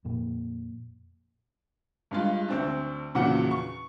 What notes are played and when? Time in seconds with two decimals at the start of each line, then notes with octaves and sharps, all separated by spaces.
0.05 F2 A#2 A#3
2.11 G2 G#3 F4
2.48 D2 C4 D4
3.15 E2 A#2 C#3 F3 F#4 F#5
3.51 C#6